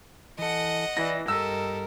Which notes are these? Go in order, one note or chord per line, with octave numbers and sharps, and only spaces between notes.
E3 A4 D#5 F#5
E3 E4 D5 A#6
G2 G4 A4 A#4 D#5 E6